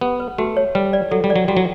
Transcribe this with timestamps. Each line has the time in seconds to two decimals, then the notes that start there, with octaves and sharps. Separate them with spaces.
0.01 B3 G4
0.20 B4
0.38 A3 F#4
0.57 C#5
0.75 G3 B4
0.93 D5
1.11 F#3 A4
1.24 G3
1.30 D5
1.36 F#3
1.48 G3 F#4
1.57 F#3